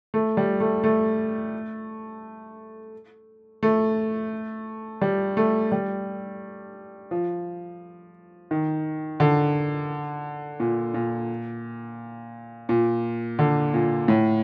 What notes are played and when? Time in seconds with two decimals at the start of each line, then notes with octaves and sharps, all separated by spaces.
0.14 A3
0.37 G3
0.60 A3
0.84 A3
3.63 A3
5.02 G3
5.37 A3
5.72 G3
7.11 F3
8.51 D#3
9.20 D3
10.60 A#2
10.94 A#2
12.69 A#2
13.39 D3
13.74 A#2
14.08 A2